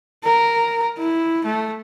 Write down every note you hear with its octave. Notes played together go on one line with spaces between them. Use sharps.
A#4
E4
A3